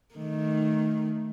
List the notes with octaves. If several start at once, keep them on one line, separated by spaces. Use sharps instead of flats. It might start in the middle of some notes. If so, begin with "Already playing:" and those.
D#3 A3